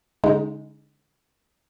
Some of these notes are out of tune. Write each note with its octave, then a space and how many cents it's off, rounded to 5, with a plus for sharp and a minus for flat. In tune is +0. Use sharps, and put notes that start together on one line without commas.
D3 -35 G#3 +0 D#4 +10